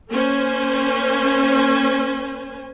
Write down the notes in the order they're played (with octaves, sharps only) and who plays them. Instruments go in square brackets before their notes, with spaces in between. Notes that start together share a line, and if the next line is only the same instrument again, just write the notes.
[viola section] A#3 C#4 C5 G#5